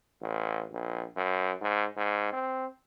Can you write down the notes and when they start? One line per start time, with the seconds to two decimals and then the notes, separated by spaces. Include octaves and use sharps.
0.21 A1
0.72 A#1
1.17 F#2
1.61 G#2
1.97 G#2
2.33 C4